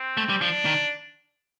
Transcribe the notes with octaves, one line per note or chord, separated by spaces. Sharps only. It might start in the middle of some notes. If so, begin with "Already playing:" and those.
Already playing: C4
A3
G3
F3 D4
D#3